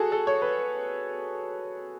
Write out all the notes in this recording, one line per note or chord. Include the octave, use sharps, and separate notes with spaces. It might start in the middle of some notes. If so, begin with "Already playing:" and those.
Already playing: F#4 G#4 A4
A4
C#5
B4